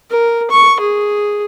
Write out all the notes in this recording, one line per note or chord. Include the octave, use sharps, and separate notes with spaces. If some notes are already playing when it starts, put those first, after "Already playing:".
A#4
C#6
G#4